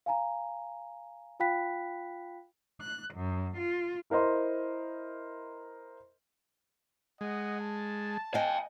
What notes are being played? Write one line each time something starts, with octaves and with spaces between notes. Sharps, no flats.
F5 G#5 A#5
F4 F5 G5 B5 F#6 B6
F#6
F#2
F4
E4 A#4 C5 D#5 C6
G#3 D#5 F#5
A5
D#5 F5 G5 G#5